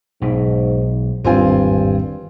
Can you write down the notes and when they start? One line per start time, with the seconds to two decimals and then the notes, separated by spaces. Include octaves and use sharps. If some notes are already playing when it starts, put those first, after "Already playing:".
0.22 B1 G#2 B2
1.25 G#1 E2 G2 C4 F4 G#5